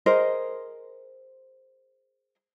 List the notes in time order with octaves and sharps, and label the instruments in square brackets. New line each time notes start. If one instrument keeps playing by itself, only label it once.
[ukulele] G#4 A#4 C5 D#5